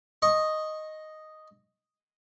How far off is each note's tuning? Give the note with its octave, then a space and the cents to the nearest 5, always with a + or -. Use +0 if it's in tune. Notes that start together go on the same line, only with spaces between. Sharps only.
D#5 +0 C#6 -25